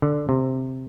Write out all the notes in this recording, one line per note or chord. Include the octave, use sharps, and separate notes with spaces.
D3
C3